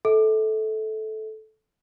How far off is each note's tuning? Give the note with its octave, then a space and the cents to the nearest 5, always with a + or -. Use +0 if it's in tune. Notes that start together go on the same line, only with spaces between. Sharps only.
A4 -15 E5 -40